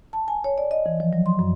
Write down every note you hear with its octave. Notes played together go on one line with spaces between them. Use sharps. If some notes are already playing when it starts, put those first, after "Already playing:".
A5
G#5
C#5
D5
D#5
E3
F3
F#3
C6
F#2